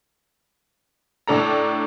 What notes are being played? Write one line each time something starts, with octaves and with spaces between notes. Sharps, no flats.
A2 D4 A4 A#5